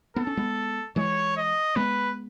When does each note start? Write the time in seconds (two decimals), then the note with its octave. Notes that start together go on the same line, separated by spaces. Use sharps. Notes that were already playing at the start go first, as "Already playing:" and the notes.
0.16 B3 A4
0.27 C#4
0.37 G#3 B3
0.96 E3 G#3 C#5
1.37 D#5
1.76 G#3 B3 B4